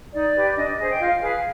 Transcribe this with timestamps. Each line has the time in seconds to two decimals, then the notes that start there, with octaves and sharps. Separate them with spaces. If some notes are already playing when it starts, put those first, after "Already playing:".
0.13 D#4 D5
0.35 G4 B4
0.56 D4 D#5
0.77 G#4 C5 D#5
0.90 G5
1.00 F4 F5
1.21 G#4 B4 F5